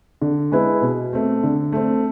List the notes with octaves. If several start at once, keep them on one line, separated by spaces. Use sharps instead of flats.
D3
G#3 B3 E4 B4
B2
A3 C4
D3
A3 C4